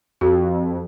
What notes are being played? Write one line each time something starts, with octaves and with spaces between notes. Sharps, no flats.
F2 F#4